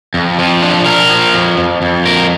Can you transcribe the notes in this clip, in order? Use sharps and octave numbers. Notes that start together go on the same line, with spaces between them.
F2
F3
D4
A#4
F3
F2
F2
F2
A#4